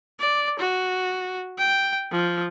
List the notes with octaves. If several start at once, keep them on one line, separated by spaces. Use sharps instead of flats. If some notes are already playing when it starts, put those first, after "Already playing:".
D5
F#4
G5
F3